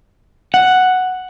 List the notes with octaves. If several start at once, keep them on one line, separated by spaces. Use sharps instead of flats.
F#5